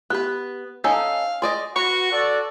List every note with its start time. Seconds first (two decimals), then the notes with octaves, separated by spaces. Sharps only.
0.10 B3 G4 B4 F#6
0.84 C#4 D#4 A4 F5 G#5 E6
1.42 G#4 D5 D#5 C6
1.76 F#4 B4 C#6
2.12 F#4 A4 D5